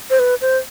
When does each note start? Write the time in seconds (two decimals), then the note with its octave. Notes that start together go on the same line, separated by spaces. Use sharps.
0.10 C5
0.19 B4
0.41 C5